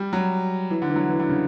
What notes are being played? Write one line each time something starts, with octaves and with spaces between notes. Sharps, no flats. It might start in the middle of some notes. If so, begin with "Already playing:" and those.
Already playing: G3
F#3
E3
D3
E3
F#3
E3
D3
C#3